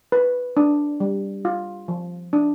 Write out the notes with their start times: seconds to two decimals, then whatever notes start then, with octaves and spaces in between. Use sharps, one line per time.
0.12 B4
0.57 D4
1.00 G3
1.45 F4
1.88 F3
2.33 D4